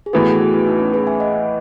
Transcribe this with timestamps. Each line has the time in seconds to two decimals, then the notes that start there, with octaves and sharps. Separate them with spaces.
0.06 G#4
0.13 A2 E3 B3 F#4 A4
0.27 G#4
0.40 F#4
0.53 E4
0.66 D#4
0.80 C#4
0.94 G#4 B4
1.07 E5 G#5
1.20 D#5 F#5